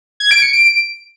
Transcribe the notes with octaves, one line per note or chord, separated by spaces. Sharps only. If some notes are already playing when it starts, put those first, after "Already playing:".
G#6
D7
C#7
D7